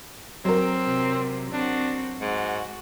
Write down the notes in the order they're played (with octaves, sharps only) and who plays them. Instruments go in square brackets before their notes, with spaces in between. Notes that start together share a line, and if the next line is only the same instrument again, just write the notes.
[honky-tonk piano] F#3 A#4 [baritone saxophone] C4
[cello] C3
[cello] C4 F#4 [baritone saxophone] D4
[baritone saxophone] G#2 [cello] F#4